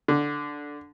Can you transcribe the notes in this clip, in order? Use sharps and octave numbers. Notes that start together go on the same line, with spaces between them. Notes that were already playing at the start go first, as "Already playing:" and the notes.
D3